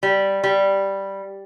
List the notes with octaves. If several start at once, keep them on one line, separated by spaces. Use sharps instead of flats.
G3
G3